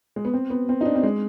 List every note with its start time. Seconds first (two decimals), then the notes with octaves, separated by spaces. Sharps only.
0.16 G#3
0.25 B3
0.34 C4
0.50 B3
0.69 C4
0.81 D#4
0.85 D4
0.95 C4
1.03 G#3